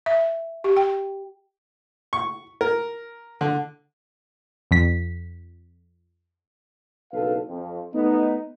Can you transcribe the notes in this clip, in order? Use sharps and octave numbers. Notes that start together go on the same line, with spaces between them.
E5
G4
G5
C#6
A#4
D3
F2 B6
F#1 B1 A4 B4 F5
F2
A3 B3 D#4